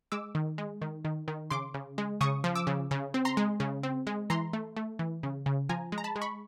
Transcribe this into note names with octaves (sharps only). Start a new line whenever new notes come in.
G#3 D6 E6
D#3
G#3
D#3
D#3
D#3
C#3 C6 D6
C#3
G#3
C#3 C#6 D#6
F3
D6 E6
C#3
C#3
C4
A#5 C6
G#3
C#3
C4
G#3
E3 A#5 C6
A3
A3
E3
C#3
C#3
F3 G#5 A#5
G#3
A#5
A5 B5
G#3
B5 C#6